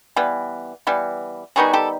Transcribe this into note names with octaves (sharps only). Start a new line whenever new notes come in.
E3 G3 B3
E3 G3 B3
D#3 G3 B3 D#4 F#4 G#4
G4 A4